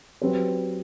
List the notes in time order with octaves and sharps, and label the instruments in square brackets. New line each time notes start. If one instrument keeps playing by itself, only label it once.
[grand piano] F#3 C4 G4 B4